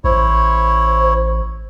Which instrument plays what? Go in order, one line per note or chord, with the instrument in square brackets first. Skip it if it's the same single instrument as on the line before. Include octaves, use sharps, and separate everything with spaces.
[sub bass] A1 [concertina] E4 C#5 [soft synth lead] C5